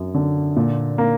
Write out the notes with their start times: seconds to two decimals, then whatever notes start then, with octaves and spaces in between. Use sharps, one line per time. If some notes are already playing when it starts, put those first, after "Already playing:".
Already playing: F#2 F#3
0.14 D3
0.56 A#2
0.98 A#3